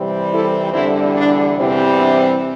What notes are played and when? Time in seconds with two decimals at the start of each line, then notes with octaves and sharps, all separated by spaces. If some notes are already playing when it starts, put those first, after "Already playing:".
Already playing: C3 E3 G3 C4
0.32 E4 A4
0.73 E2 D3 G3 C4 E4
1.15 D4
1.56 E2 C3 E3 G3 C4
1.98 D4